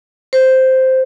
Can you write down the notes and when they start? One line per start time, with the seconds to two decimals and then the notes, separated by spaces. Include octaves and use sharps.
0.33 C5